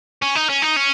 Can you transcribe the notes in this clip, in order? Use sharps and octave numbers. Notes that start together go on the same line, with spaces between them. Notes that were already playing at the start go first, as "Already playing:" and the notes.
C#4
D#4
C#4
D#4
C#4